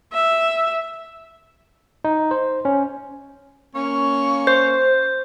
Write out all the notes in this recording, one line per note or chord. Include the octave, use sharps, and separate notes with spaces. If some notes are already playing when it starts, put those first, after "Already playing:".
E5
D#4
C5
C#4
A#3 C#4 C#6
C5 G6